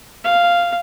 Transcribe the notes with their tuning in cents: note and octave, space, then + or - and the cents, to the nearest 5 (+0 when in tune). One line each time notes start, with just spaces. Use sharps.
F5 -5